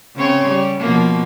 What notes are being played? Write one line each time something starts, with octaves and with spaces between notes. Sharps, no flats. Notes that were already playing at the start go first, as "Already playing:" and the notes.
C#3 C4 C#5
G3
B2 F3 A#3